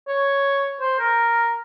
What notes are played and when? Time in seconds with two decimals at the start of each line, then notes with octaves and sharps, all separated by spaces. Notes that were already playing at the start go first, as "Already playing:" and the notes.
0.07 C#5
0.80 C5
0.99 A#4